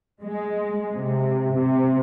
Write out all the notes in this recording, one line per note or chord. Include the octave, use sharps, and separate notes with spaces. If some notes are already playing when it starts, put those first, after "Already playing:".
G#3
C3
C3